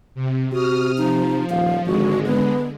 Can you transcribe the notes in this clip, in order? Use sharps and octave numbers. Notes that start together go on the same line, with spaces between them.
C3
C3 F#4 D#6 F6
F3 D#4
D#1 F5
G#1 D3 G#3 F#4
B3